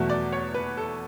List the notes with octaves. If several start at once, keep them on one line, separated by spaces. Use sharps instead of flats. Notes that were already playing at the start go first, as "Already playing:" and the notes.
Already playing: E2 B2 F#3 A3
D5
C#5
B4
A4